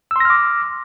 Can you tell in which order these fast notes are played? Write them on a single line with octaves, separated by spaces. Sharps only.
E6 C6 A#6 F6 D6